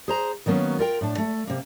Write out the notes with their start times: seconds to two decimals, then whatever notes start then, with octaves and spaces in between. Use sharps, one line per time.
0.08 G#4 C5 A#5
0.46 D#3 F#3 A#3 B3 C#4
0.79 F4 A#4 G5
1.01 A2 D4
1.18 A3
1.47 C3 A#3